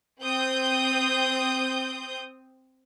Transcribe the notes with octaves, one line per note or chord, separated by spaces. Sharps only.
C4 D#6 G6